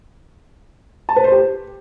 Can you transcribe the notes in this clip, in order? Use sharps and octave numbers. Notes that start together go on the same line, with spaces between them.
A5
B4
C5
G4